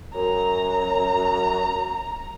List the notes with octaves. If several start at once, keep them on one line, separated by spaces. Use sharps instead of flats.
F#2 A#5